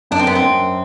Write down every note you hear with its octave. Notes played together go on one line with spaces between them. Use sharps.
F#2 D4
C4
B3
C4
F#2